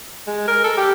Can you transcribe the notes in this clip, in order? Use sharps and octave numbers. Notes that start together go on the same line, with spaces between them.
G#3
A#4
A4
G4